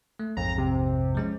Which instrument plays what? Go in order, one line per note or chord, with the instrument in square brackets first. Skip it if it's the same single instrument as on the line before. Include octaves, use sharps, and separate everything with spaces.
[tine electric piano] A3
[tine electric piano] A#1 F2 G#2 [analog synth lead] A#5
[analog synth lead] C3
[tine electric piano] F3 G#3 C#4